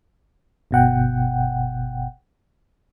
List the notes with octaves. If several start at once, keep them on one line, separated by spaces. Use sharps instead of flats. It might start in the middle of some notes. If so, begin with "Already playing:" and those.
G1 B2 F#5 G5